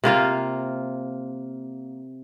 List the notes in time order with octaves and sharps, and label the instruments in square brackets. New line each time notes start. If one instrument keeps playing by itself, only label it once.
[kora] C3 A#3 F4 F5